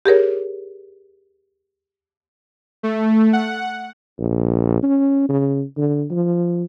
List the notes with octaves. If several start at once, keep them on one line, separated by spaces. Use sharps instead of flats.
G4 G#4 A#4 C#5
A3
F#5
A#1
C#4
C#3
D3
F3